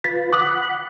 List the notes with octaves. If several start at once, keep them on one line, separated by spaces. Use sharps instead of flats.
F4 B4 A6 B6
F#5 B5 D6 D#6 F#6